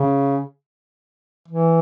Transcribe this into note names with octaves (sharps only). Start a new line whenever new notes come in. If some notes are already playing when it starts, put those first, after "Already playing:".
Already playing: C#3
E3